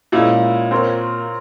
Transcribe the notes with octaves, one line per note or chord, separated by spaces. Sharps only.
A#2 G#3 C#4 E4
C4 F4 A#4 C#5